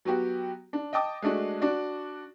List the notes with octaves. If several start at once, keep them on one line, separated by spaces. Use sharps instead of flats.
F#3 B3 F#4 G4
D4
D#5 G5 A5 D6 D#6
G#3 A3 D4 F#4
D4 F#4 D5